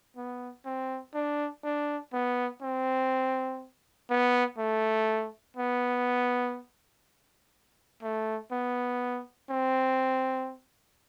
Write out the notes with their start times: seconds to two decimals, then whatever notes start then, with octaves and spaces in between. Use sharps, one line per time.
0.16 B3
0.65 C4
1.14 D4
1.64 D4
2.13 B3
2.62 C4
4.10 B3
4.58 A3
5.57 B3
8.02 A3
8.52 B3
9.50 C4